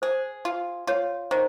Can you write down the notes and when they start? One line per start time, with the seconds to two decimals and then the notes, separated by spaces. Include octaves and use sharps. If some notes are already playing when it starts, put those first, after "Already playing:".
0.02 G#4 C5
0.45 F4
0.87 F4 C#5
1.31 D#3 C5